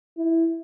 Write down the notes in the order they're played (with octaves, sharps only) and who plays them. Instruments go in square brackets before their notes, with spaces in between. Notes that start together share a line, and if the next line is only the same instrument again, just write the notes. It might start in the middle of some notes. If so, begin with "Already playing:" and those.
[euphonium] E4